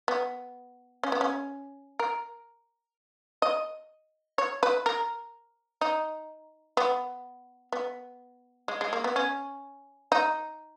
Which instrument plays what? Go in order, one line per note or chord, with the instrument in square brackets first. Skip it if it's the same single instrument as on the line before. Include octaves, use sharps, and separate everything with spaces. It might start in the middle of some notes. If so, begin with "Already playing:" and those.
[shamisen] B3
C#4
B3
C#4
A#4
D#5
C#5
B4
A#4
D#4
B3
B3
G#3
G#3
A#3
B3
C#4
D#4